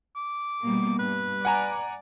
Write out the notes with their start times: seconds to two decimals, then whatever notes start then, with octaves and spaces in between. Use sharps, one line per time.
0.16 D6
0.62 B2 G3 A#3
0.99 G2 B4
1.45 D5 F#5 G#5 A#5